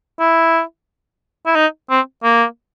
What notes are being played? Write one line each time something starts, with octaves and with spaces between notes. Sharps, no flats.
E4
E4
D#4
C4
A#3